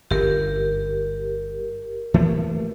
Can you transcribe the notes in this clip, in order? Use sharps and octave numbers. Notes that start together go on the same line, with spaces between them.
G1 F#2 G4 A#4
E3 A3 A#3